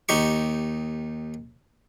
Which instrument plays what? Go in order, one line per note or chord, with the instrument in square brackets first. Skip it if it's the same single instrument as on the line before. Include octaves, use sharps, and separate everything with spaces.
[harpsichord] D#2 D#4 G4 C#6